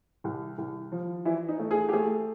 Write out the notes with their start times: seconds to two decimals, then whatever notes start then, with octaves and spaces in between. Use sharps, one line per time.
0.24 C2
0.58 C2
0.92 F3
1.25 E3 E4
1.48 D#4
1.59 A3
1.71 G#4
1.89 G4
1.93 A3 G#4